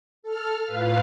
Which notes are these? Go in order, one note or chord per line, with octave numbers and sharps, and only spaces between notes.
A4 F6
A2 F4 B4 F5